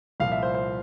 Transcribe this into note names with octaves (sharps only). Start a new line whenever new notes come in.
C2 A#2 F3 F5
E5
C5
C5